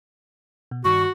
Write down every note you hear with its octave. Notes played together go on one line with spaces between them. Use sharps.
B2
G2 D#3 F#4 C#6